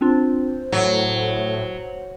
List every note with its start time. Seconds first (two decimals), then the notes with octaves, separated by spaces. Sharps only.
0.01 C4 D4 F4 C5
0.72 A2 F#3 C#5